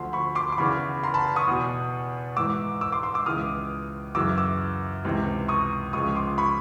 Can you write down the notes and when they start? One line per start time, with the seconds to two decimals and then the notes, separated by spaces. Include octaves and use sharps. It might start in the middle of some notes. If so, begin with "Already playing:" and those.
Already playing: D2 D3 F3 C6
0.13 B5 C#6
0.35 C6 D6
0.52 D6
0.58 E2 C#3 E3 B5 C#6
1.03 A#5 C6
1.14 A5 B5
1.36 C#6 D#6
1.47 E2 B2
2.36 G#2 E3 D6 E6
2.81 D6 E6
2.92 C6 D6
3.03 C6 D6
3.14 D6 E6
3.26 C#2 C#3 E3 D#6 F6
4.15 F#2 C#3 E3 D6 E6
4.38 D6 E6
5.05 C#2 C3 E3
5.48 C#6 D#6
5.93 C#2 C#3 F3 C#6 D#6
6.15 C6 D6
6.38 B5 C#6